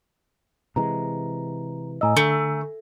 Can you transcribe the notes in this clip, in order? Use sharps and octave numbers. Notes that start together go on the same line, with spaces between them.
C3 E3 G#3 A#5
A2 D#5 G#5 A#5 E6
D3 A3